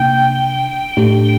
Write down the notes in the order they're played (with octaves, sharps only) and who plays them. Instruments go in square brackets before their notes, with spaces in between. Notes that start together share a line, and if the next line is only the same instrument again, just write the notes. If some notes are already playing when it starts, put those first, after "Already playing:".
Already playing: [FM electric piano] C3 A#3 D4 [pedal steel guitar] G5
[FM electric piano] A2 A3 D4 G4